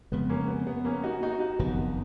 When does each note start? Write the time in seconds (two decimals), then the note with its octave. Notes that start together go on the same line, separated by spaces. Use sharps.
0.12 F2 C#3 G#3 B3
0.29 A#3 C#4
0.48 B3
0.67 B3
0.85 A#3 C#4
1.03 D#4 F#4
1.23 D#4 F#4
1.40 D#4 F#4
1.59 F#1 F2 D#3 B3